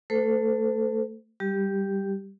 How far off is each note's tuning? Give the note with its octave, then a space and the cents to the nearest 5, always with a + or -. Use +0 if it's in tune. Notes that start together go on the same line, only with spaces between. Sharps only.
A3 +15 A4 +5 C5 -40
G3 +0 G4 +0